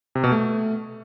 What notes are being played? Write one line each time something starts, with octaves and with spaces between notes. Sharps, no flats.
C3
B2
A3